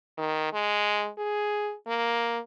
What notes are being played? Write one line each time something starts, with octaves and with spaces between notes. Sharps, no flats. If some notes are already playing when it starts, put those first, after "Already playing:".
D#3
G#3
G#4
A#3